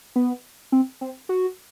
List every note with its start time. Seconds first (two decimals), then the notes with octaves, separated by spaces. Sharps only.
0.16 B3
0.72 C4
1.01 C4
1.29 F#4